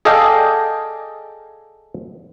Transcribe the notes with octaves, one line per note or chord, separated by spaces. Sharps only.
G#4 A4 D5 D#5 F5 G5